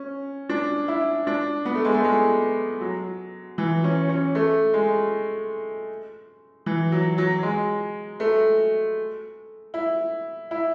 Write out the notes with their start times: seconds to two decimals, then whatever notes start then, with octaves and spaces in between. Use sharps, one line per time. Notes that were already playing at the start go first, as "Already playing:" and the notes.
Already playing: C#4
0.49 D4
0.88 E4
1.27 D4
1.65 B3
1.75 A3
1.85 G#3
1.94 A3
2.04 G#3
2.81 F#3
3.58 E3
3.84 C#4
4.09 C#4
4.35 A3
4.74 G#3
6.66 E3
6.92 F#3
7.18 F#3
7.43 G#3
8.20 A3
9.74 E4
10.51 E4